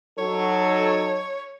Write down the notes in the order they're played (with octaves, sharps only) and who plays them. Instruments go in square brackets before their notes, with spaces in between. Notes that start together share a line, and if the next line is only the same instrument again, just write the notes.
[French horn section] F#3 D#4 A4 [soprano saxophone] C#5